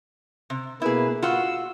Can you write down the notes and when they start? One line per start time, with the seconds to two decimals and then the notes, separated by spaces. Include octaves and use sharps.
0.50 C3
0.82 B2 A#3 E4 G#4 B4
1.23 F4 F#4 F#5 E6